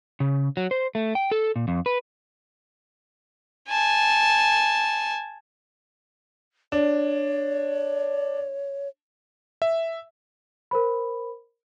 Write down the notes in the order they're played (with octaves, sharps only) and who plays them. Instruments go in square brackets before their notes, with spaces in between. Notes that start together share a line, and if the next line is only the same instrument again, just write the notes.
[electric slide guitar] C#3
F#3
C5
A3
G5
A4
A#2
F2
B4
[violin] G#5 A5
[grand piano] D4 [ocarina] C#5
[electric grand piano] E5
[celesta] A#4 C5 B5